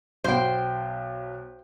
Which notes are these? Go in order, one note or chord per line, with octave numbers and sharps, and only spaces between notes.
B1 B2 C5 G5